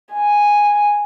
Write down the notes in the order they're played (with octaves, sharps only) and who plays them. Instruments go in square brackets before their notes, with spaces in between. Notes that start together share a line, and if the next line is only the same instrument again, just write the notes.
[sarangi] G#5